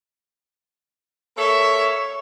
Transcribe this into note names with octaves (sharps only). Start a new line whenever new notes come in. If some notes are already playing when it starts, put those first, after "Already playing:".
A#3 A4 C#5 E5